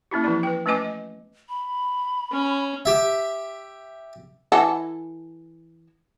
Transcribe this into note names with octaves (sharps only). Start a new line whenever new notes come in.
A#3 C#4 E4 G4
E3 F3 C4 E4 D5
B4 G5
A3 C#4 B4 D#5 G#5 D6
D#5
B5
C#4
G4 E5
E3 A4 F#5